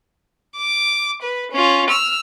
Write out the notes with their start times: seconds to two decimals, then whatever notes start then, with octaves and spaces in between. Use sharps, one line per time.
0.58 D6
1.22 B4
1.52 C#4 F4
1.89 E6 F6